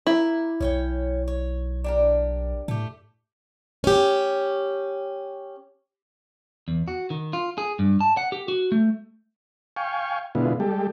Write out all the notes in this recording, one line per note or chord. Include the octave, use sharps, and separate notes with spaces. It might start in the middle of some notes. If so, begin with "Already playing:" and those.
A#3 E4 E5
B1 C#4 C#5 G5
C#5
D4 G4 A#4
A2 A3 G4
C#4 G4
E2
F#4
D#3
F4
G#4
G2
A5
F#5
G4
F#4
A3
F5 G5 G#5 C#6
B2 D3 G#3 B3 E4 F4
G3 G#3 G4 A4